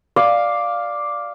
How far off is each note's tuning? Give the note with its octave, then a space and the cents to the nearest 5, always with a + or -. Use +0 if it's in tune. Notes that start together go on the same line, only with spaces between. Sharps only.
D5 +0 F5 +0